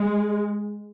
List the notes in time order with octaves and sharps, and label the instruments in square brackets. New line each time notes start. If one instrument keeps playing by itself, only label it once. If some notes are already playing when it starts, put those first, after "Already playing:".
Already playing: [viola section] G#3